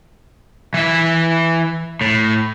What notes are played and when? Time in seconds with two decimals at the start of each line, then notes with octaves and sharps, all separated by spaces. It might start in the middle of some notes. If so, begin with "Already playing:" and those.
0.74 E3 E5
2.01 A2